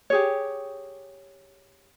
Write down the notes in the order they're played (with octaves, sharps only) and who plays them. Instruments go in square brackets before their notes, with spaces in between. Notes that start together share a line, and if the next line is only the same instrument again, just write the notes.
[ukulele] G4 G#4 C#5